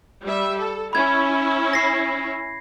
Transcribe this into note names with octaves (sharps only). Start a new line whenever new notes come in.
G3 E5
A4
C#4 E4 B5 G#6
A#6 C7